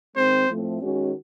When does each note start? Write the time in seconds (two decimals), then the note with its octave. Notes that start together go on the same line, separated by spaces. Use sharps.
0.16 D#3 G#3 C4 C5
0.48 A2 F3 A3 C4
0.81 D#3 G#3 C#4 F#4